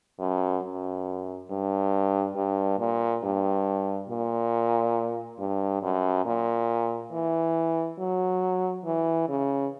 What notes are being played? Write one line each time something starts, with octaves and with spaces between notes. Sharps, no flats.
F#2
F#2
G2
G2
A#2
G2
A#2
G2
F#2
A#2
E3
F#3
E3
C#3